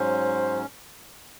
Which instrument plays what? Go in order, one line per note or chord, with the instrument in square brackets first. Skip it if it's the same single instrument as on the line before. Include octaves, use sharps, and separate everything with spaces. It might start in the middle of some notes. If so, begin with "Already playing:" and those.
Already playing: [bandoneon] G#2 F#3 C#4 [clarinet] C5